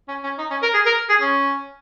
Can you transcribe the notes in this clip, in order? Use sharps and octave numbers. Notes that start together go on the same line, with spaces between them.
C#4
C#4
D#4
C#4
A#4
G#4
A#4
G#4
C#4